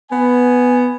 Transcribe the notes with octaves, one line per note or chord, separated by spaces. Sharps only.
B3 G#5